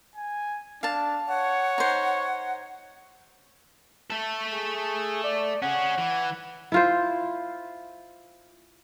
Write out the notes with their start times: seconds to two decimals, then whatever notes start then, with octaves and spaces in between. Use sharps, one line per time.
0.16 G#5
0.83 D4 F5 A5
1.28 C#5 F#5
1.78 D#4 C5
4.10 A3 A4
4.52 G#4
5.24 D5
5.62 C#4 G#4 F#5
5.98 E3
6.72 E4 F4 C5